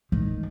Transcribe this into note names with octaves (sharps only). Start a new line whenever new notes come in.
D#3